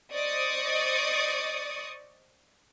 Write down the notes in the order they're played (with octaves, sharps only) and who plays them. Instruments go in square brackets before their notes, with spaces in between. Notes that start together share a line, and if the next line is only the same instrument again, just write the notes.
[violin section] C5 D5 D#5 C#6 D#6